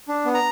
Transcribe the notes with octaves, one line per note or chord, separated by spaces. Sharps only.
D4
B3
A#5